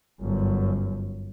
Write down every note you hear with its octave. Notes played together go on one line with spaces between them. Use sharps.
G1 F#2